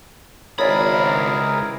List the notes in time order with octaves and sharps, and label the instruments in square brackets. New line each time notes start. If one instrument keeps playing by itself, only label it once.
[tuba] G#1 [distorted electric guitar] C#2 B5 [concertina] E4 G#4 A#4 [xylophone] C#5 D5